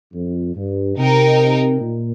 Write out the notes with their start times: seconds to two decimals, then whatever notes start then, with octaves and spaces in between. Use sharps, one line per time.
0.13 F2
0.55 G2
0.96 C3 D#4 A#4 G5
1.80 A#2